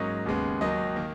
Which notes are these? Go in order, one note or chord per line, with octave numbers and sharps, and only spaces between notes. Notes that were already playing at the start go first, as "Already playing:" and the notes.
Already playing: G#2 F#3 A#3 C#4 D#5
D#2 C#3 G#3 B3
D#2 D#3 F#3 D#5
D#3 A#3